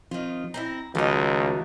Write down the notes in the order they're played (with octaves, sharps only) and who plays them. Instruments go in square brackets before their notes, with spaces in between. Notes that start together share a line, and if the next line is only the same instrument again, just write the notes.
[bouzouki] D#3 F4 [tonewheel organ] F3 C4
[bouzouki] C4 D4 E4 [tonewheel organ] A#5
[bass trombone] C#2 [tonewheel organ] D#3 F3 F#4 [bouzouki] A3 D#4